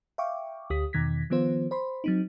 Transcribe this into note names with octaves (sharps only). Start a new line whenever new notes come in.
E5 F5 G5 C#6 D6
D2 G4 D#6 B6
E2 B2 D#3 G#6 A#6 B6
D#3 F3 B3 F4 C5
C5 B5 C6
F#3 C4 D#4